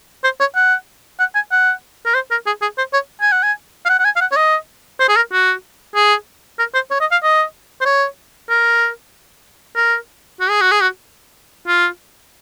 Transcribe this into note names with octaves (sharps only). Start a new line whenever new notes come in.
C5
C#5
F#5
F#5
G#5
F#5
A#4
C5
A#4
G#4
G#4
C5
C#5
G#5
F#5
G#5
F5
F#5
F#5
G#5
F5
F#5
C#5
D#5
C5
G#4
A#4
F#4
G#4
A#4
C5
C#5
D#5
F5
D#5
C5
C#5
A#4
A#4
F#4
G#4
F#4
G#4
F#4
F4